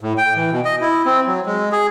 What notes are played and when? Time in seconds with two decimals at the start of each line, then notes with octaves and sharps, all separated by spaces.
0.01 A2
0.18 G5
0.36 E3
0.52 B2
0.65 D#5
0.81 E4
1.06 C4
1.27 F#3
1.46 G#3
1.72 G#4